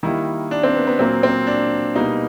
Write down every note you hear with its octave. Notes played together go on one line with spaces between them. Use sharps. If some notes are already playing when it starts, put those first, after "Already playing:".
D#3 G3 A#3 E4
D4
C4
B3
B3
A#2 F#3 A#3 C4
C4
D4
B2 G3 A#3 D#4